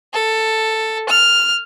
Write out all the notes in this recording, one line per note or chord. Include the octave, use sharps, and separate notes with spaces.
A4
F6